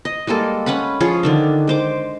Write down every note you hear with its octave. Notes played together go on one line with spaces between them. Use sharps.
D#5
G3 G#3 A#3 A4
C#4 B4 F#5 B5
F3 C#4 G#4 C#5
D3 D#3 D4
G#3 C5 D6